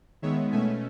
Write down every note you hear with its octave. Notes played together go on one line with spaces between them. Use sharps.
D#3 G#3 B3 C#5 E5
B2 A3 C#4 E5 G#5